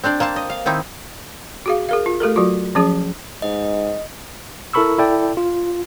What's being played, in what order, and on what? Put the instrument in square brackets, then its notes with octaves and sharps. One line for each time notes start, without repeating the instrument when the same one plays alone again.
[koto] C4 D4 C5 D5
A#3 C4 C5 A5
D#5
F5
D#3 C4 D#4 E4
[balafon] F#4 G#4 F5
G#4 A#4 F5
F4
A3 G4 A4 A#4
F#3 F4 F#4
F3 F#3 C#4 G#4
[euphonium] G#2 [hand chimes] D#5
[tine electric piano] E4 A4 A#4 B5 C#6 E6
E4 A4 D5 G5
F4